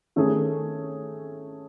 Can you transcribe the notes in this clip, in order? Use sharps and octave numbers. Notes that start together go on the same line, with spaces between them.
D#3 A3 C#4 G#4